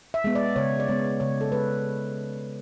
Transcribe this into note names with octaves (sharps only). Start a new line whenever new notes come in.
E5
G#3 B3
D5
C#3 C#5
D5
G#3 B3 C#5
C#3 C#5
A4
G#3 B4